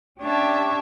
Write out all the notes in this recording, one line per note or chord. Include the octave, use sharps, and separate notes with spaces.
C#4 D4 G4 C#5 E5 A5